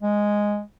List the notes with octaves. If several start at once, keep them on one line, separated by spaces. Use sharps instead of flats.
G#3